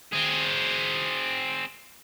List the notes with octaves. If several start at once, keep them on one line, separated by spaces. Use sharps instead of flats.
C4 G#4